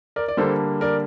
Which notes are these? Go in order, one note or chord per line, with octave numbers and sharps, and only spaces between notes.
A#4 D5
D5
D3 G3 A#3 A4 C5
A#4 D5